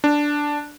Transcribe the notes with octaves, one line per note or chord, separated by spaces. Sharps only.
D4